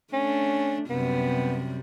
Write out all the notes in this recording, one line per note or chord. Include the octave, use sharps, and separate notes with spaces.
A3 C#4 D4
F#2 C3 G3 B3